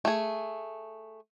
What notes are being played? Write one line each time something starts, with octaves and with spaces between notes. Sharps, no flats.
A3 G#4